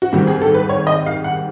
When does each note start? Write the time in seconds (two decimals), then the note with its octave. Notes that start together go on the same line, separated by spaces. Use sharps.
0.02 F#4
0.13 G#2 D#3 G3 C4 G4
0.27 G#4
0.41 A4
0.54 B4
0.69 C#5
0.87 D#5
1.06 F5
1.24 F#5